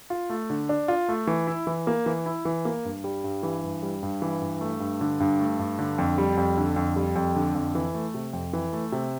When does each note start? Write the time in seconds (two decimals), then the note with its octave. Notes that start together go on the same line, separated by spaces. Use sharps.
0.10 F4
0.30 A3
0.50 D3
0.69 D4
0.88 F4
1.09 A3
1.27 E3
1.47 E4
1.67 E3
1.87 A#3
2.06 E3
2.26 E4
2.45 E3
2.65 A#3
2.85 G2
3.04 G3
3.24 G2
3.43 E3
3.63 G2
3.83 G3
4.03 G2
4.22 E3
4.41 G2
4.61 A3
4.80 G2
5.01 D3
5.20 G2
5.39 A3
5.59 G2
5.79 D3
5.98 F2
6.18 G3
6.37 F2
6.57 D3
6.76 F2
6.96 G3
7.16 F2
7.35 D3
7.55 F2
7.75 E3
7.94 A3
8.14 C3
8.33 F2
8.53 E3
8.73 A3
8.92 C3